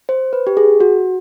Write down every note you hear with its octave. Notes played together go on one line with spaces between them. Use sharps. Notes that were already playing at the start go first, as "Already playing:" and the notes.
C5
B4
G4
G#4
F#4